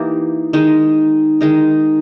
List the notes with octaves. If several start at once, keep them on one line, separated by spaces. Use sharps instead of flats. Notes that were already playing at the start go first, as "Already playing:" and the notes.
Already playing: E3 A#3 D#4 G4
D#3 G#3 D#4
D#3 G#3 D#4